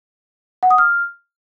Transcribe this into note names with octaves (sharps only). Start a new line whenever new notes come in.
F#5
D#6
F6